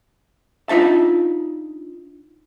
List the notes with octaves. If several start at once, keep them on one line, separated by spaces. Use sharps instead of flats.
D4 D#4 F4 E5 A5